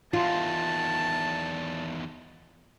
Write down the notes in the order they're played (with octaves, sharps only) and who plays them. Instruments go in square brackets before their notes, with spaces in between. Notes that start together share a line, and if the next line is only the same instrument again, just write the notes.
[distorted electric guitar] E2 D#3 [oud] F4 [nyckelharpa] A5